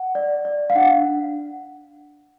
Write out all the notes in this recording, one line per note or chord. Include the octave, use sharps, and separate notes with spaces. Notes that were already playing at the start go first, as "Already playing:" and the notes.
Already playing: F#5
D5
D5
F5
D4 F#5
D4